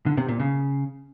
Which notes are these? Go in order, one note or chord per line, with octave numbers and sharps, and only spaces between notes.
D3
C3
A#2
C#3